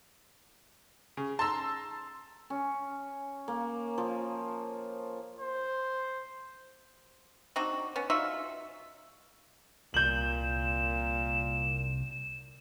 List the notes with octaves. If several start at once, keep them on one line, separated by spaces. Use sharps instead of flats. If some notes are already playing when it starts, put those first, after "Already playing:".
C#3
A5 A#5 C6 E6
C#4
A#3
F3
C5
C4 D4 D#4 F#4
B3 C#4
D#4 F4 F#4 E5
C2 A#2 G6 E7 F#7